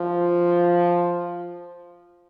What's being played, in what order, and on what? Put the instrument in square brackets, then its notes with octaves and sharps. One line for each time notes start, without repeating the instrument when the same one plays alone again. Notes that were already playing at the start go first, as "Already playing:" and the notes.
Already playing: [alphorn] F3